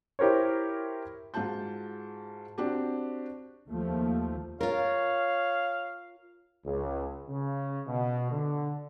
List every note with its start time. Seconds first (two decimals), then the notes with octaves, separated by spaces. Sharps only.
0.19 E4 G4 A#4 C5 C#5
1.34 G#2 F4 F#4 A5 G6
2.58 C4 D4 F#4 G4
3.68 D#2 F3 A3
4.61 F4 A#4 C#5 F5
6.65 C#2
7.28 C#3
7.87 B2
8.31 D3